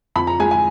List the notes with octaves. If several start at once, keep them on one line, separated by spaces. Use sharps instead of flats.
F2 B5
A#5
G#3 G#5
G#5